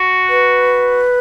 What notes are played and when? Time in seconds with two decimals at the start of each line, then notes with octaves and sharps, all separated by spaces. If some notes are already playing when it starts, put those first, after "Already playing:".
Already playing: F#4
0.29 B4